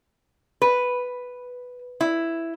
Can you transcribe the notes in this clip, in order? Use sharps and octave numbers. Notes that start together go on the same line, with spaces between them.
B4
E4